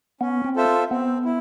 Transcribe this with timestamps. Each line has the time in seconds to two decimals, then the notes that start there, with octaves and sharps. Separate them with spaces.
0.21 B3 C#4
0.44 C4
0.56 F4 A4 C5 E5
0.90 B3 C4
1.25 E4